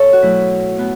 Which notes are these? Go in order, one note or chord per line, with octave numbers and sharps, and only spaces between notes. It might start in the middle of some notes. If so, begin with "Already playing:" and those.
Already playing: E2 A4 C#5
F#4
B2 F#3 A3 E4
A2 B3